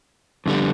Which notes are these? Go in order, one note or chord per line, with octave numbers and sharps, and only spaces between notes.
F2 D3 G3